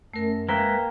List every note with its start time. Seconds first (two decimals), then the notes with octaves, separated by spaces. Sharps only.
0.14 F#2 A3 A#4
0.49 G#3 A#3 A#4 B4 E5 G5